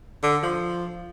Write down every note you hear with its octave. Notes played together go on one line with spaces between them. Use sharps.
D3
F3